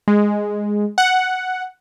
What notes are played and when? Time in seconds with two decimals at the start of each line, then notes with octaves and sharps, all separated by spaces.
0.08 G#3
0.98 F#5